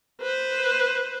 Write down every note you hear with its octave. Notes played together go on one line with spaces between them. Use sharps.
B4 C5